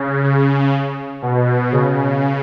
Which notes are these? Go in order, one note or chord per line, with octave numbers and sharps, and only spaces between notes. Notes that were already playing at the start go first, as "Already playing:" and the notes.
Already playing: C#3
C#3
B2
C#3